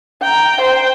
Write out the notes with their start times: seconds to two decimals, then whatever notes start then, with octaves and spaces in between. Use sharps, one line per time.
0.22 G5 A#5
0.61 C5 G5